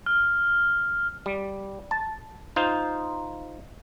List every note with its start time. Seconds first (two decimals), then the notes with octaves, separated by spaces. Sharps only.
0.06 F6
1.26 G3
1.91 A5
2.56 D#4 F4 C5